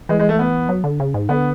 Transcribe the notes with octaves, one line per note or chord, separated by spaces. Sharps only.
E3 G#3
G#3
A3
B3
F#3
D3
C#3
G#2
D3 B3